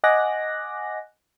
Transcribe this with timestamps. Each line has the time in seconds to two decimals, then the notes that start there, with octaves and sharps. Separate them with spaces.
0.04 D#5 F#5 G#5 D6 F#6 A#6